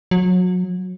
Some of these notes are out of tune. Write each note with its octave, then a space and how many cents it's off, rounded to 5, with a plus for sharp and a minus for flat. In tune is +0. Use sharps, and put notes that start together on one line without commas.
F#3 -30